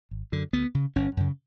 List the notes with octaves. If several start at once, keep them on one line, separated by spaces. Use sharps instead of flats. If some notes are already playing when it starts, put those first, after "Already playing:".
G#1
F#2 D3
D2 B3
C#3
G1 C#4
F#2 C#3